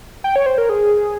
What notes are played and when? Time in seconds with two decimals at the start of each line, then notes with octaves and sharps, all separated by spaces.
0.24 G5
0.36 C#5
0.46 C5
0.58 A#4
0.69 G#4